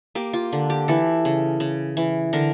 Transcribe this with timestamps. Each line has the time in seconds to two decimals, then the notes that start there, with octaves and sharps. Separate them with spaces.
0.15 A#3 G4
0.33 F4
0.53 D3
0.70 G4
0.88 E3 A4
1.25 C#3
1.60 C#3
1.97 E3
2.33 D3 A#4